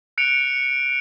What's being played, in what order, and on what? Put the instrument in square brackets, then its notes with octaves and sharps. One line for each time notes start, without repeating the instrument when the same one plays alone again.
[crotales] F#6 C#7 D7 F7